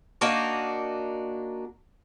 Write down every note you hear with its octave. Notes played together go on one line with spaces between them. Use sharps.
A#3 D4 D#4 F#4